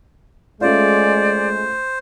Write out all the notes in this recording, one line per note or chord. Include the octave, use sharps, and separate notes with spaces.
G#3 A3 C#4 F4 C5 D5